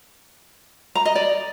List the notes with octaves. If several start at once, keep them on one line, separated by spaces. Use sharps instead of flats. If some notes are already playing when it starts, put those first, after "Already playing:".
A#5
D#5
D5